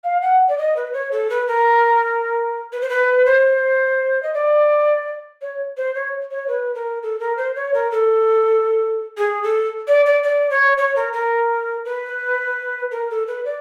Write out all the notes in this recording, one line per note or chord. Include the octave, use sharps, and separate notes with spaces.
F5
F#5
D5
D#5
B4
C#5
A4
B4
A#4
B4
C5
B4
C5
D#5
D5
C#5
C5
C#5
C#5
B4
A#4
A4
A#4
C5
C#5
A#4
A4
G#4
A4
D5
D5
D5
C#5
C#5
A#4
A#4
B4
A#4
A4
B4
D5